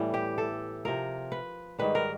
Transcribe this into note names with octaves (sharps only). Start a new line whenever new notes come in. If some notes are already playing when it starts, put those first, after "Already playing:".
Already playing: A2 E3 G3 B3
G4
A4
C3 F3 A#4
B4
G#2 D#3 G3 B4
A#4